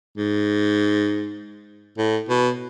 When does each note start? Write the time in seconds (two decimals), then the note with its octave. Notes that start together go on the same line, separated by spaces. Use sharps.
0.17 G#2
1.98 A2
2.29 B2